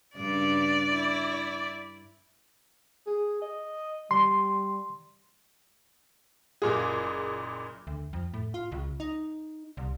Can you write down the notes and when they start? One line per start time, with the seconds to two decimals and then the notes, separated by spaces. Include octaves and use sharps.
0.16 G2 C#3 D4 D5
0.91 E4
3.07 G#4
3.42 D#5
4.11 G3 C6
6.62 F#1 A#2 G#4
7.87 D2
8.13 F2
8.34 A2
8.54 F4
8.72 C#2
9.00 D#4
9.77 C2